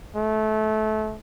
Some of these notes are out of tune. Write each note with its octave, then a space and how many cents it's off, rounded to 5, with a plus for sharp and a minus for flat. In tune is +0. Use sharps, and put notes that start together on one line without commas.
A3 -25